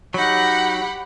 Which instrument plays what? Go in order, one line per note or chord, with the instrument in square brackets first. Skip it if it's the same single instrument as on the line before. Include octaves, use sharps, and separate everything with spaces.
[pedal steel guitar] F#3 D#4 [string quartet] G4 F#5 B5